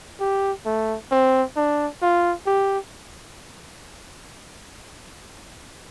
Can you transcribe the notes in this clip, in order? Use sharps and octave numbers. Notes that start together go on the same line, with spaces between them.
G4
A3
C4
D4
F4
G4